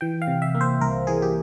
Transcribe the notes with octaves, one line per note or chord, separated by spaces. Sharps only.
E3 G5
F5
C3
E5
A#3
C5
C2 A#4
E3 G#4
G4